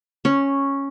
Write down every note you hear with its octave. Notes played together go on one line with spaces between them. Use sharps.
C#4